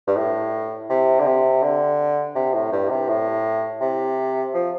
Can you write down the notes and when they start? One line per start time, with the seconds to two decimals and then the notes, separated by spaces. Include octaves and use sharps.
0.07 G2
0.17 A2
0.90 C3
1.19 D3
1.26 C3
1.62 D3
2.35 C3
2.54 A2
2.72 G2
2.90 C3
3.08 A2
3.81 C3
4.54 F3